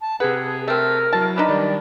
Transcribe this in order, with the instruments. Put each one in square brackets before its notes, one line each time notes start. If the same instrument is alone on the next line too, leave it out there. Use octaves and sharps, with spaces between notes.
[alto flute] A5
[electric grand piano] C3 F#5 [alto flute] G#4 [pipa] B4
[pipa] A3 C4 [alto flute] A#4
[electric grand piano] F#3 E4 [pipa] A5
[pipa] E3 D4 D#4 [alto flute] B5
[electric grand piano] D#3 G3 [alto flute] D5